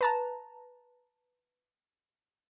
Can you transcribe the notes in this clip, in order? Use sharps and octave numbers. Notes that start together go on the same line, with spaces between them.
B4 A5 A#5